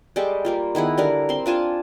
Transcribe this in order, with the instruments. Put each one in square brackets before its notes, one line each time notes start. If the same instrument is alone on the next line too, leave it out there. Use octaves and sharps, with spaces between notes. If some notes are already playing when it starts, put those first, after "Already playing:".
[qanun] G3 G#3 G4 A4
G3 A#3 F4
D#3 B3 E4 G#4
D3 G3 A#4
C4 C6
D4 F4 G#5 A5